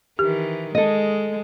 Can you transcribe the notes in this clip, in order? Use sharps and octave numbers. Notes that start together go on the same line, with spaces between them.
D#3 E3 G4
G#3 A4 D#5